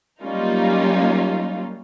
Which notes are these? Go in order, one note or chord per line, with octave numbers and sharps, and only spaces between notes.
F#3 G3 A#3 C#4 D#4 F4